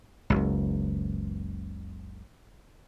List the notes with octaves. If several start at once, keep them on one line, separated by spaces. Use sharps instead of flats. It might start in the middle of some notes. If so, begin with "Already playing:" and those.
F#1 C#2